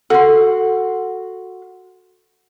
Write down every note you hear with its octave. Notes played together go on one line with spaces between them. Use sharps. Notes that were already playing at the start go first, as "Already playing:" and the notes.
F#4 A4 C6